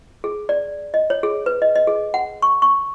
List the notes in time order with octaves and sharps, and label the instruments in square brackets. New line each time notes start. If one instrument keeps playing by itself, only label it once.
[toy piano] G#4
D5
D#5
C#5
G#4
B4
D#5
D#5
G#4
F#5
C#6
C#6